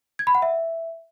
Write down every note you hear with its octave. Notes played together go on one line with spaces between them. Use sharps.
G#6
B5
F#5
E5